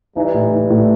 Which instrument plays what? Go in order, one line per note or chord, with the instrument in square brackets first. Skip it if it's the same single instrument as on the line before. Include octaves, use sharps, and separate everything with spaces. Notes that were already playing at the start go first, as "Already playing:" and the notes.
[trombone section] E3 G3 [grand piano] D#4
[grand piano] A2
D#4
A2